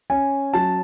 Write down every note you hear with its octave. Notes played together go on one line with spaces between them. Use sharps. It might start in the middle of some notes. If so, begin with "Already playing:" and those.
C#4 G#5
F#3 A5